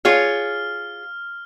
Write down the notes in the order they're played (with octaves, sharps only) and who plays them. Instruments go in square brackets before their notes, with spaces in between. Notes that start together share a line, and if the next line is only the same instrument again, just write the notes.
[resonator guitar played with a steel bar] F4 G#4 C#5 [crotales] F6